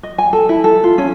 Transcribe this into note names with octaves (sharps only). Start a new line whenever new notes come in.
D#5
G#5
A4
E4
A4
F4
C#4